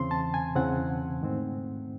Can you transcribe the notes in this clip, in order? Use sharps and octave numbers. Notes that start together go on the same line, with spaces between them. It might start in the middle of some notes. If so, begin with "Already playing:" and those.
Already playing: E2 C#3 E3 C4 C6
A5
G#5
E2 C#3 E3 C4 F#5
G#2 D#3 A3 C4